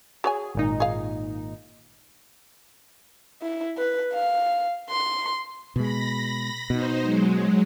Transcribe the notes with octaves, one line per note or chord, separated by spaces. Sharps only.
F#4 G#4 C#5 G#5
G#1 A#2 D#4
G#4 F5
E4
B4
F5
C6
B2 G#3 B5 A#6
B2 D#4 C5
F#3 G#3